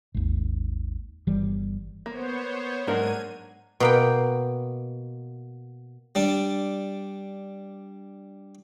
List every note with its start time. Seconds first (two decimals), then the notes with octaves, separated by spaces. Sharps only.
0.14 G#1 D#2
1.27 G1 E3 G3
2.06 A#3 B3 C5 C#5
2.87 G#2 F#3 A#3 D4 A#4 G#6 D#7
3.80 B2 A#3 G5
6.15 G3 D4